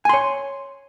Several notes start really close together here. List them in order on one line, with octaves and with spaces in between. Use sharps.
G#5 C6 C#5